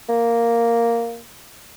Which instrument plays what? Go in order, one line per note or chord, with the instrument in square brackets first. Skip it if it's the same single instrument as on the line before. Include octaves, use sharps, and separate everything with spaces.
[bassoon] A#3